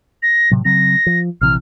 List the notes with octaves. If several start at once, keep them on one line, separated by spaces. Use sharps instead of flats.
A#6
A2 C3 F#3
C#3 F#3 C4 A#6
F3
A#1 C3 E3 F6